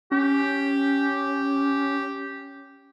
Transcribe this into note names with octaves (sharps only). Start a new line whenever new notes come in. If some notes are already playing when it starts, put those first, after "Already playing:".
C#4 G4